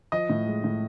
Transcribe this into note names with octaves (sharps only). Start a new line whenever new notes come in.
F3 D#5
A2
G#3
A2